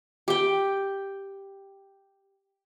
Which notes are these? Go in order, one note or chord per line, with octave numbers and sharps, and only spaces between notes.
G4 G5